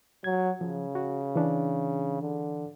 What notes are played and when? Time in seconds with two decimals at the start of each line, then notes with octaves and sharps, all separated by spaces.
0.24 F#3 G#6
0.61 C#3 F3
0.95 F#4
1.36 E3 D4
2.21 D3